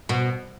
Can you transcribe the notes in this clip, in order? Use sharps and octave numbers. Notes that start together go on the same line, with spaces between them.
B2